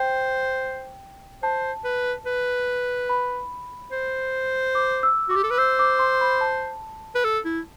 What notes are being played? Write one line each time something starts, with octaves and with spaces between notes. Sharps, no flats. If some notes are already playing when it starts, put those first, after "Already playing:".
Already playing: C5 G5
C5 A5
B4
B4
B5
C5
D6
E6
F#4 D6
G4
A4
B4
C5 E6
D6
C6
B5
A5
B4
A4
E4